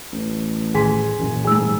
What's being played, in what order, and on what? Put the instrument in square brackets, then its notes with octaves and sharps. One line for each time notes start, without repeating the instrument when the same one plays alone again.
[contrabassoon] A1
[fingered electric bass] A2 D#3 G3 [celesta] G#4 [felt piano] G#5 C6 B6
[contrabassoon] F#2 [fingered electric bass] A#2 E3
[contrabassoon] F#1 [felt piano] G#2 G3 G#4 [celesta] G#5 E6